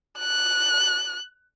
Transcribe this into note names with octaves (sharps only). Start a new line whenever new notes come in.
F#6